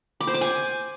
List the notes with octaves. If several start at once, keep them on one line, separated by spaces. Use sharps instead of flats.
D6
C5
D6
G#5